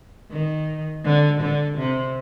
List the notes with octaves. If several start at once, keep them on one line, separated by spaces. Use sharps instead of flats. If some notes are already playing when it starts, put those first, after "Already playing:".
D#3
D3
D3
C3